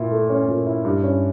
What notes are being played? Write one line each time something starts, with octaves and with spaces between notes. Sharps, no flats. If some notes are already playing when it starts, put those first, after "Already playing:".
Already playing: A#2 E4
A3
C#4
A#2
E4
G2
C#4